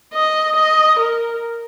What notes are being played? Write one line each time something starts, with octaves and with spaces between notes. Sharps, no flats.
D#5
D#5
A#4